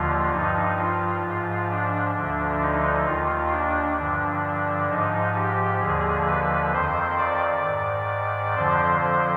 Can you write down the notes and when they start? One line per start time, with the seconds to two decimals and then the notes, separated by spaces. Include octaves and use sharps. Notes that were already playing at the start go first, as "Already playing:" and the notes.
Already playing: D#2 D3 F3 F4
0.32 G2 F3 D#4
0.78 F4
1.23 G#2 F3
1.69 D4
2.14 D2 D3 F3 D4
2.61 D#4
3.06 D#2 D#3 F4
3.52 D4
3.97 G2 D3 F3 D4
4.89 G#2 F3 D#4
5.35 G4
5.80 D#2 D3 F3 G#4
6.26 B4
6.72 F2 D#3 C5
7.17 D5
7.63 G#2 D#3
8.54 F2 D3 F3 C5
9.00 C5